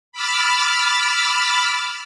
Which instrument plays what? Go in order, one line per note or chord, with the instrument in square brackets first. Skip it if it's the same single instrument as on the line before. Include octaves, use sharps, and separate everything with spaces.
[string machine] B5 D6 E6 F6 A6